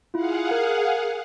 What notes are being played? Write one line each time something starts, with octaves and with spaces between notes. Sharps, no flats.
E4 F4 G#4 F5 F#5
A#4